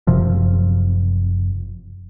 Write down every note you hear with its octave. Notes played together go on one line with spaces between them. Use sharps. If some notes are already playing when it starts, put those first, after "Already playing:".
F#1 F#2 C3 F3